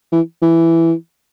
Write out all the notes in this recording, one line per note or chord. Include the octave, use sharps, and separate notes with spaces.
E3
E3